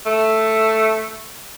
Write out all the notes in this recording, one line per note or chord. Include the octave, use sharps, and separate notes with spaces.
A3